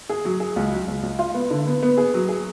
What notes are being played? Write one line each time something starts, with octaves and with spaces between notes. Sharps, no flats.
G#4
F#3
G#4
C#2
F#3
C#2
C#2
F4
B3
D3
B3
B3
G#4
F#3
G#4